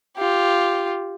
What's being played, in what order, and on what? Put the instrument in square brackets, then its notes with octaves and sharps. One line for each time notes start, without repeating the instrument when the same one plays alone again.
[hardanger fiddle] F4 G4